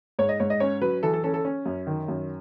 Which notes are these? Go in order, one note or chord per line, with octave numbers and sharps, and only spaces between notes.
G#2 C#5
D#5
G#2 C#5
D#5
C#4 C#5
F#3 B4
E3 A4
A4
C#4 A4
A4
C#4
F#2
D#3
F#2